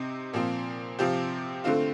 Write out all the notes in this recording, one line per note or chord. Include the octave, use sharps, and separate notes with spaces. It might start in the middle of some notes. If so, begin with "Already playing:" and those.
Already playing: C3 C4 D#4
A#2 F3 C4
C3 F3 C4 G4
D3 A3 C4 F4